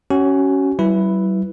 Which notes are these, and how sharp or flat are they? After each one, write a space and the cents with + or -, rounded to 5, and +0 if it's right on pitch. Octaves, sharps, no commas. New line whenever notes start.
C#4 +0 F#4 +30
G3 -45 E4 +0 B4 +0